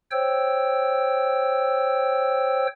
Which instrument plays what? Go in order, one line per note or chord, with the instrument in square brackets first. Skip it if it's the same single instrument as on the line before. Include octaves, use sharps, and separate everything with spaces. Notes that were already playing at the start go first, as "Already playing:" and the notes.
[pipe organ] C5 C#5 G5 E6